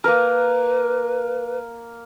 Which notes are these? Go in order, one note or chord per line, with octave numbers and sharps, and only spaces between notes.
A#3 A#4 B4